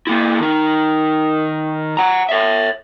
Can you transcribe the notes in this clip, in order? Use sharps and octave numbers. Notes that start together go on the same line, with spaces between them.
A#3 E4
D#3 D#4
F#5 A#5
C#5 E5